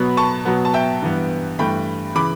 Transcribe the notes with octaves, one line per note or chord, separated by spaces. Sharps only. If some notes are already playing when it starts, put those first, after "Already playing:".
Already playing: B2 F#3 B3 B5
A5 C#6
B2 F#3 B3
A5
E5 G5
G2 E3 B3
G2 E3 A3 G5 B5
C#3 E3 B5 D6